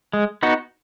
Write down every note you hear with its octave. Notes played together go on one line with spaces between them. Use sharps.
G#3
B3 D#4 F#4